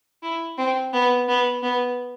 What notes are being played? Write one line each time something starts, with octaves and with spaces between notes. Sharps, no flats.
E4
C4
B3
B3
B3